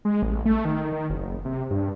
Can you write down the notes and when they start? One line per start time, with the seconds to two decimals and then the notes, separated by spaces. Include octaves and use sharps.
0.05 G#3
0.22 A1
0.46 A3
0.65 D#3
0.92 D#3
1.10 F#1
1.45 C3
1.71 G2